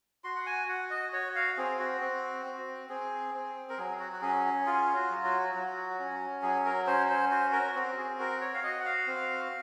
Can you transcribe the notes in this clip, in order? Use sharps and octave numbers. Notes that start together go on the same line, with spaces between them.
F#4 C6
F#5
G#5
F#4 F#5
D#5
F#4 C#5
F5
C4 G#4
F#4
C4
C4
C4 G#4
C4
A#4
F#3 G#4
F#4
F#4
C#4 G#4
F4 G#4
F#4
F#3
F#4
F#3 F#4
C#4
F#3 G#4
A#4
C#4 C5
C5
F#4 C5
A#4
C4 F#4
G#4
F#4 A#4
C#5
F5
F#4 D#5
F#5
F5
C4